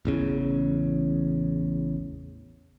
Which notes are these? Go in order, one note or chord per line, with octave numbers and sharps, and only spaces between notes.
A1 E2 C#3